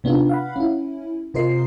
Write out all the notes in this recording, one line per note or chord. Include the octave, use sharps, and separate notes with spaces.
C3 B3 D4 D#4 F4
F5 F#5 B5
C#4 E4
C3 F4 A#4 C5 D#5 C7